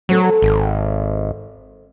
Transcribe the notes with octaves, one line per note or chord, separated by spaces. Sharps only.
F#3 C4 A4
G#1